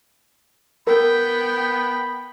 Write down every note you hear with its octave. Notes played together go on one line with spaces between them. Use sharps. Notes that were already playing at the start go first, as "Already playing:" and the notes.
B3 A#4 G5 B5